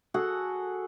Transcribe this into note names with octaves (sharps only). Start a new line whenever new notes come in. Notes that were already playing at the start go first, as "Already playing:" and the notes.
F#4 G#4 A4 F#5